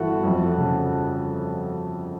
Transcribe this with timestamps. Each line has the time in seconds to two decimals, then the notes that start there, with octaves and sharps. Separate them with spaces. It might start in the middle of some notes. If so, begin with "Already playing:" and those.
Already playing: G1 E3 F#4 A4
0.24 F2
0.58 C#3